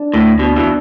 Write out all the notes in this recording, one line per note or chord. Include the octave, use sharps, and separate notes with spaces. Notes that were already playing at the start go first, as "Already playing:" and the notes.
Already playing: D4
D2 A2
B2 D4
B2 E3